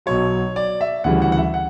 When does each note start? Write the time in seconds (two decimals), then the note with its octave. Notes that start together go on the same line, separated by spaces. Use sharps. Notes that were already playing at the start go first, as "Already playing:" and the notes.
0.06 B1 B2 F#3 C#5
0.56 D5
0.81 E5
1.04 D2 C#3 E3 G3 F#5
1.22 F#5
1.32 F#5
1.38 E5
1.54 F#5